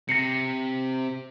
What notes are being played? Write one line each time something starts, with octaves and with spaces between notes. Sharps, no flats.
C3 A#6 C7 C#7